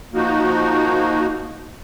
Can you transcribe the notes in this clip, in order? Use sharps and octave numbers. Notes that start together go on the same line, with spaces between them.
F3 A#3 D#4 F#4